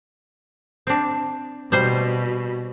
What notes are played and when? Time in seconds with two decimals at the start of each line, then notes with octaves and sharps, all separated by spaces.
0.87 C4 D4
1.72 B2 G3 C5